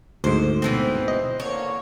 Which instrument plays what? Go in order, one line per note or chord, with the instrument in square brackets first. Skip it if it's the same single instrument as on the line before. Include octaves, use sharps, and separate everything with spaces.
[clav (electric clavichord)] D2 G#2 [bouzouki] C5
[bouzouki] B2 E3 C4 [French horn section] C5
[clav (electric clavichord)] D#5
[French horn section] D3 E3 A#3 [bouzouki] C#5